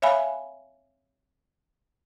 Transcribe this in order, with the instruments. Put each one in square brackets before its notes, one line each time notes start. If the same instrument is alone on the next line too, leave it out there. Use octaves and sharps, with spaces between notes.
[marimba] C#5 E5 F5 G#5 B5